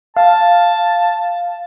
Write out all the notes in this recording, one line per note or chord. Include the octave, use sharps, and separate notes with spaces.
F5 A5